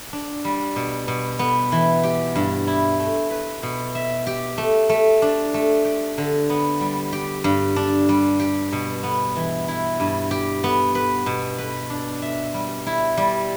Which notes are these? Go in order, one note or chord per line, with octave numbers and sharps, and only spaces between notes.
D4
G3
B2
B2
B3
E3
G4
G2
E4
A3
B4
B2
E5
G4
A3
A3
D4
A3
G4
D3
B3
G3
G4
G2
D4
G3
G4
B2
B3
E3
E4
G2
G4
B3
B4
B2
B4
D4
E5
G3
E4
G3